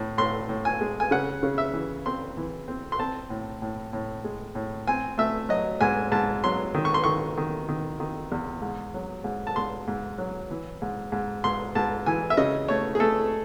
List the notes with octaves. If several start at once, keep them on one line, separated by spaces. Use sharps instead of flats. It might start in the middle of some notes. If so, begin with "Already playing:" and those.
Already playing: A2
A2 C6
A2
G#5
G#3
G#5
C#3 F#5
C#3
E5
E3
C4 C6
E3
C4
C6
C4 A5
A2
A2
A2
G#3
A2
C4 G#5
A3 E5
F#3 D#5
G#2 G#5
G#2 A5
F#3 C6
D#3
C#6
C6
D#3 C#6
D#3
D#3
D#3
E2
G#2
F#3
G#2
A5
G#2 C6
G#2
F#3
E3
G#2
G#2
G#2 C6
G#2 A5
E3 G#5
E5
C#3 D#5
A3 C#5
G#4
A3 A4